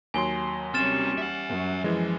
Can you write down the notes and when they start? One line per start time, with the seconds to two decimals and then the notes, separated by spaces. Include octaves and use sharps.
0.14 D#2 F#3 G#5 C6 G7
0.74 G3 C4 C#4 G4 F6 A6 E7
1.18 E5 F#5
1.48 F#2
1.84 E3 F3 G#3